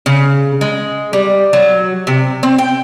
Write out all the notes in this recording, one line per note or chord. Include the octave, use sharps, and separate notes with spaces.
C#3
G#3
G3
F#3
C3
C4
G5